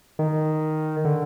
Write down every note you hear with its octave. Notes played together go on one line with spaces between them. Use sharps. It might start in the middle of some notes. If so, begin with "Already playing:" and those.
D#3
D3